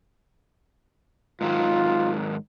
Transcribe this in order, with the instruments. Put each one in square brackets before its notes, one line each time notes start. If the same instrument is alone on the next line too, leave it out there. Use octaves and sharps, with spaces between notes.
[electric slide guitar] G#2 D#3 F#3 [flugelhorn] F4